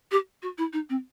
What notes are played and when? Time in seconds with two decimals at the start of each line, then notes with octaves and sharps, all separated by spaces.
0.11 G4
0.42 F#4
0.58 E4
0.73 D#4
0.90 C4